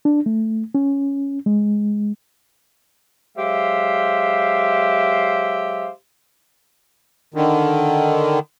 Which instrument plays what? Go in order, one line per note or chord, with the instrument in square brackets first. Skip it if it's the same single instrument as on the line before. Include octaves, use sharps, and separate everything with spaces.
[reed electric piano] D4
A3
C#4
G#3
[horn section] F#3 G#3 G4 C5 E5 F5
[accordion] D3 D#3